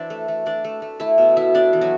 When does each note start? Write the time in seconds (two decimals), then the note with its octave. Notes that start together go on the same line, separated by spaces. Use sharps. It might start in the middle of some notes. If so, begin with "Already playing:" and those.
Already playing: E3 C4 D4 C5 D5 E5
0.10 A3
0.28 A3
0.46 A3 D4 D5
0.64 A3
0.82 A3
1.00 A3 E4 E5
1.18 B2
1.36 A3 E4 E5
1.54 B3 D4 D5
1.73 E3
1.81 F#3 F#4